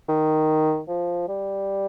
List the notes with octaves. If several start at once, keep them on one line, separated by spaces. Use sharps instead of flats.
D#3
F3
G3